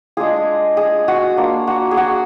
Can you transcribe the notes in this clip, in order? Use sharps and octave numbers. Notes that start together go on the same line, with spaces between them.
G#3 D4 F4 G#4
G#4
F#4
A#3 D4 F4
F#4
G#4
F#4